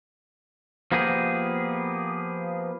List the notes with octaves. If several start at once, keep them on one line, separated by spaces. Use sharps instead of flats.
F3 A#3 B3 G4 G#4